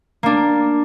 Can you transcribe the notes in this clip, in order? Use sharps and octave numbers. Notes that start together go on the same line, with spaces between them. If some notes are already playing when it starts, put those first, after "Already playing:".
A#3 D4